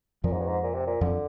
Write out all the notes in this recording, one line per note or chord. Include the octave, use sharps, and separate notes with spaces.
F2 A#2 F3
G#2
G2
G#2
A#2
C3
A#2
F2 D3 F3